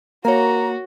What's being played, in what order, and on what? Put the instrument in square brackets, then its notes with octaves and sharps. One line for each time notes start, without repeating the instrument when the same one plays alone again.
[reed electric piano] A#3 [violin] F#4 [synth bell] A#4 C#5 [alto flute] A#5